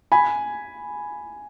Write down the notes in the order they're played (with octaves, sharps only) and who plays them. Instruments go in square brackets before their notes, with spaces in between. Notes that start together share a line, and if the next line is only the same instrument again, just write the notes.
[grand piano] G#5 B5